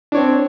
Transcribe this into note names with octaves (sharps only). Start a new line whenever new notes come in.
C4 D4 C#5